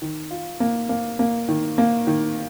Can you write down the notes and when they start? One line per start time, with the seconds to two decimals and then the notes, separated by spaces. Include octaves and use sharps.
0.02 D#3
0.31 F4
0.60 A#3
0.89 A#3
1.19 A#3
1.49 D#3
1.78 A#3
2.07 D#3